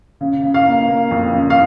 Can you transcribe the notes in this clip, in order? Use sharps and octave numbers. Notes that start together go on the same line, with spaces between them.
C#3
C#3
F5
A#3
A#3
F2
C#3
F5